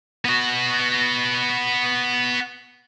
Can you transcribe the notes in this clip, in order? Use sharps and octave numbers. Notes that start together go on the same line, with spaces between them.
B3 F#4